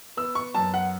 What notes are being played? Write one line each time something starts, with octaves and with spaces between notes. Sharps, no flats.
B3 E6
C#6
F#2 A5
F#5